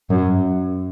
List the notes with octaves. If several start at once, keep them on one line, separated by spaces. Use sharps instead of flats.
F#2